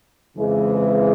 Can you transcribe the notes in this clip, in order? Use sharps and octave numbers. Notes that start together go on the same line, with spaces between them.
F2 C#3 E3 G#3
G#4